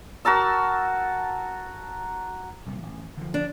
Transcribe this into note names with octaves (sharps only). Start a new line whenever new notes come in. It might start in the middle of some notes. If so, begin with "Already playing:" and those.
F#4 A#4 A5 E6
C2 A#2
A1
D3 E3 F3
D4